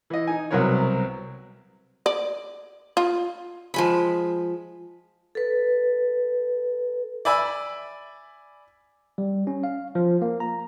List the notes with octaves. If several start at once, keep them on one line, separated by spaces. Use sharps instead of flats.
E3 D#5
D#4 G#5
C2 B2 F#3 B3 A#4 C#5
D5
F4
F3 G#3 B5
A4 B4
D5 E5 G#5 B5 E6
G3
C#4
F5
F3
A#3
A#5